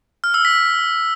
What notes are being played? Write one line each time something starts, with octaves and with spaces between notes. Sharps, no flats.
F6
E6
B6